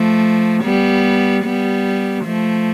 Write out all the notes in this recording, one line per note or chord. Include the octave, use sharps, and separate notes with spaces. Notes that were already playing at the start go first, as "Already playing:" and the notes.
Already playing: F3 A3
G3 B3
G3 B3
F3 A3